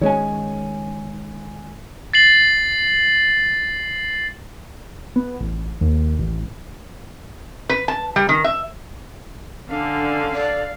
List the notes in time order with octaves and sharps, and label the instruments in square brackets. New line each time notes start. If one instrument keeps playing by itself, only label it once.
[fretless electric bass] D#3 G#3 C#4 [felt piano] C#5 D#5 G#5
[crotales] A6 C7 F#7
[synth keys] B3
A1
D#2
A1
[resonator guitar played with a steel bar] B4
A5
G3
D#3
E5
[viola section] D3 [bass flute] C#4 [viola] F5
[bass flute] A4 [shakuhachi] D5